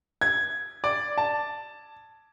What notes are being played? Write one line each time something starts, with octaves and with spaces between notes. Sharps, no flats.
G#6
D5
A5